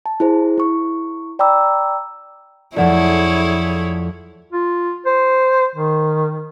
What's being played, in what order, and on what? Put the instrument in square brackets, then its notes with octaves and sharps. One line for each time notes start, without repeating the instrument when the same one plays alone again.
[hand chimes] A5
E4 G#4 C5
E4 C#6
D5 G5 A#5 B5 D6 E6
[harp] F2 F3 A3 [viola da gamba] E4 G#4 C#5 [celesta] D5 F#5
[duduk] F4
C5
D#3